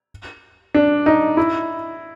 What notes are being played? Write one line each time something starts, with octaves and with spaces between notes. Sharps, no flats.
D4
D#4
E4